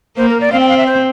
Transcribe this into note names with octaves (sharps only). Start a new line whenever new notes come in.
A#3 C5
A#4
D5
C4 F5
G5
F5
E5
C5